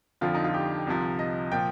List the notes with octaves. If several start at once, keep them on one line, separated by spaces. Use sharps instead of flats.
F2 D3 F3 F4
D#4
F4
G4
C2 C3 F3
D#5
A#2 F3 G5